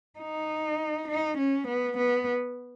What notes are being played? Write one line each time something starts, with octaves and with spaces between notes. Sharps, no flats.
D#4
D#4
C#4
B3
B3